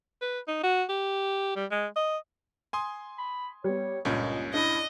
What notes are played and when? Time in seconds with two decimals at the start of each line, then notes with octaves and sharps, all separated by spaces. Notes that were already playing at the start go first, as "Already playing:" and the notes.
0.22 B4
0.48 D#4
0.64 F#4
0.89 G4
1.56 G3
1.71 G#3
1.96 D#5
2.73 G#5 C6 D#6
3.18 B5
3.64 G3 B3 C#5
4.05 C#2 G2 A#2 C#4 D#5
4.54 D4 E4 D#5